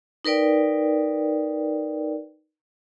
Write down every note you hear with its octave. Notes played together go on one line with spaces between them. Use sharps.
D#4 A#4 B4 D5 G5